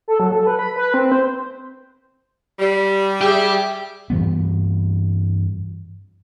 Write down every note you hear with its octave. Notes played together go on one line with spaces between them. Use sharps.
A4
F#3
A4
B4
B5
B4
C4
C5
G3
G4 G#4 D5 E5
G2 E3 G3 B3